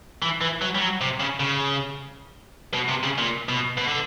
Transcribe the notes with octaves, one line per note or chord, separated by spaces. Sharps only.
E3
E3
F#3
G3
F#3
C3
C#3
C#3
B2
C3
C#3
A#2
B2
B2
D3